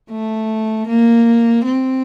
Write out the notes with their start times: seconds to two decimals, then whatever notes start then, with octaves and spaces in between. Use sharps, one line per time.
0.11 A3
0.88 A#3
1.65 C4